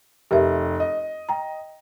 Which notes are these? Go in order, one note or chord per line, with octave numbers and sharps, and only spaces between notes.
F1 G4 A#4 E5
D#5
G5 A#5